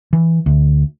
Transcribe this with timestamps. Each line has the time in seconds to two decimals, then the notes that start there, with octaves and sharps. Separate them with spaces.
0.13 E3
0.46 D2